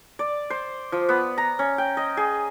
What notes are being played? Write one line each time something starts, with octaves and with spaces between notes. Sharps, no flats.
D5
C5
F3
B3
A#5
C#4
G5
D#5
G#4